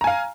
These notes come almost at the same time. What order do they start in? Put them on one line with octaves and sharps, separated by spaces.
A#5 G#5 F5